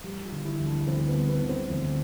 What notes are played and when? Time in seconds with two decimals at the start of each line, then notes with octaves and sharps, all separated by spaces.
0.04 G3 G4
0.25 F4
0.32 D3
0.45 E4
0.59 D2
0.66 D4
0.87 D2 C4
1.08 B3
1.14 G3
1.29 B3
1.42 D3
1.49 C4
1.70 D2